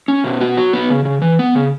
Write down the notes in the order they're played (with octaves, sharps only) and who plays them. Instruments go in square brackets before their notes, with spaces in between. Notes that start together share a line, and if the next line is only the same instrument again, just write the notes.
[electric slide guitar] C#4
B2
F#4
F#3
B3
C#3
C#3
E3
B3
C#3